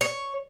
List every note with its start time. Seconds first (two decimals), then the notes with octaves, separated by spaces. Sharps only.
0.01 C#5